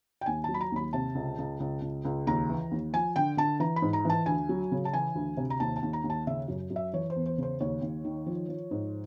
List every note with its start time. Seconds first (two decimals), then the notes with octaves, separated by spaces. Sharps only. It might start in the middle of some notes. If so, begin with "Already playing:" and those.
0.21 G5
0.26 D#2 G#5
0.44 F#3 A5
0.54 B5
0.61 A#5
0.72 D#2 B5
0.93 C3 A5
1.15 C#2
1.38 C#2
1.60 C#2
1.82 C#2
2.05 C#2
2.27 D#2 A#5
2.49 E3
2.71 D#2
2.93 F3 G#5
3.16 D3 G5
3.37 D3 A5
3.60 E3 A#5
3.76 B5
3.82 G#2
3.93 A#5
4.05 E3 A5
4.26 D2 G#5
4.49 F#3
4.72 C#3
4.85 A5
4.93 E3 G#5
5.15 D2
5.37 C3
5.50 A#5
5.60 D#2 A5
5.76 A5
5.82 D#2
5.93 A#5
6.04 D#2
6.10 A5
6.27 C#3 E5
6.48 F#2
6.70 F#2
6.76 E5
6.93 E3 C#5
7.10 C5
7.16 E2
7.26 C5
7.38 C#3 C5
7.60 D#2 C#5
7.81 D#2
8.05 D#3
8.26 F3
8.48 F3
8.71 G#2